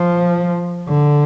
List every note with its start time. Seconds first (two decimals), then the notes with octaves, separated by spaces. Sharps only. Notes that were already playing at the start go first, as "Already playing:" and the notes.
Already playing: F3
0.88 D3